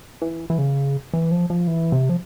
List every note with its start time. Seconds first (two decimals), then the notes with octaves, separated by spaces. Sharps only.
0.22 E3
0.50 E3
0.58 C#3
1.14 E3
1.31 F3
1.50 F3
1.67 E3
1.92 C3
2.09 F3